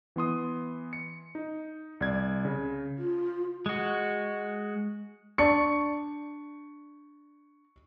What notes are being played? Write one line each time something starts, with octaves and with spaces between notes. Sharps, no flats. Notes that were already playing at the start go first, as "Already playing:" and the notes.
E3 B3 C6 D#6
C#7
D#4
C2 D5 G#6
C#3
F4
G#3 F#4
D4 D5 C#6 C#7